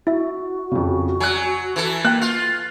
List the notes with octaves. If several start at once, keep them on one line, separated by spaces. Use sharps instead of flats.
E4 F#4 E5
F2 C#3
F#3 G#5 F#6
E3 A4
A#3 G5 F#6
F4